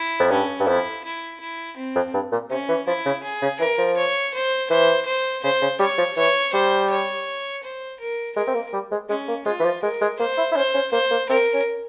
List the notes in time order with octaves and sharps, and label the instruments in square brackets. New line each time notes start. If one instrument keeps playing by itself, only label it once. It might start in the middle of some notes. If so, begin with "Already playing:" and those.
Already playing: [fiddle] E4
[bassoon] F2
[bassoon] G2 [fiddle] C#4
[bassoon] G2
[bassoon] F2 [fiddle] E4
[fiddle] E4
E4
C4
[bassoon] F2
G2
A#2
[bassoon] C3 [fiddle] C#4
[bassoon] E3
[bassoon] F3 [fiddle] E4
[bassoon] C#3
[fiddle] G#4
[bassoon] C#3
[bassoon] E3 [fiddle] A#4
[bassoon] F3
[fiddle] C#5
C5
[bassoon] E3 [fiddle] C5
[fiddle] C5
[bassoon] C#3 [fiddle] C5
[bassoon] C#3
[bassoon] G3 [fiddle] C#5
[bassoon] F3
[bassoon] E3 [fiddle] C#5
[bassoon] G3 [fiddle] C5
[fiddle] C#5
C5
A#4
[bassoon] G#3 [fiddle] A#4
[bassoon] C4
A#3
G3
G#3
[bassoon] G#3 [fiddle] C#4
[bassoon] A#3
[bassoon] G#3 [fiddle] F4
[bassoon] E3
F3
[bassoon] G#3 [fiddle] A#4
[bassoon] G#3
[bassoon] A#3 [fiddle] C5
[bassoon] E4
E4
[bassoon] C#4 [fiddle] C5
[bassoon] C#4
[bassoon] A#3 [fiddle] C5
[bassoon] A#3
[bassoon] C4 [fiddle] A#4
[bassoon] C#4